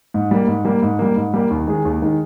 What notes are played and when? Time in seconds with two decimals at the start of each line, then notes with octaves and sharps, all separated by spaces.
0.14 G#2
0.31 G3 A#3
0.47 G#2
0.65 G3 A#3
0.82 G#2
0.99 G3 A#3
1.17 G#2
1.34 G3 A#3
1.51 D#2
1.67 D#3 G#3 D#4 G#4
1.85 D#2
2.02 D#3 G#3 D#4 G#4